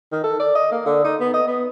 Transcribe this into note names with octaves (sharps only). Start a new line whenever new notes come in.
D#3
A4
D5
D#5
A#3
D3
D#4
B3
D#5
B3